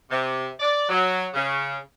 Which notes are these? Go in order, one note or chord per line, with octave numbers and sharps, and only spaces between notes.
C3
D5
F#3
C#3